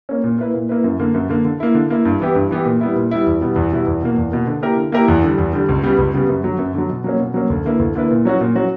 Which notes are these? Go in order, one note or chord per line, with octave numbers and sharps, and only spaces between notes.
A#3 C#4
A#2
A#3 E4 B4
A#2
A#3 E4 B4
F#2
D3 A#3
F#2
D3 A#3
D3
A#3 E4
D3
A#3 E4
G2
E3 B3 E4 G4
G2
E3 B3 E4 G4
A#2
G3 B3 E4
A#2
G3 B3 E4
E2
B2 G3 B3 E4
E2
B2 G3 B3 E4
E2
B2 A#3
E2
B2 A#3
D3
A#3 E4 G4 A#4
D3
A#3 E4 G4 A#4
E2
D3 G3
E2
D3 G3
C#2
C#3 G3 B3
C#2
C#3 G3 B3
F#2
D3 F#3
F#2
D3 F#3
B2
F#3 A#3 C#4
B2
F#3 A#3 C#4
D2
D3 A#3 E4 B4
D2
D3 A#3 E4 B4
A#2
F#3 C#4 F#4
A#2
F#3 C#4 F#4